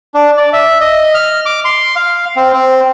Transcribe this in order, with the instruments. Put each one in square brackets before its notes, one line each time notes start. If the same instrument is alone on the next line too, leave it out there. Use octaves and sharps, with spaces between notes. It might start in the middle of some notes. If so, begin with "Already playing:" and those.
[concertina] D4
D5
E5
D#5
F6
D6
C6
F5
C4
C4